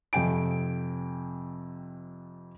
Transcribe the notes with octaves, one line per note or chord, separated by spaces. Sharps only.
F2 C3 G5 G#5 D7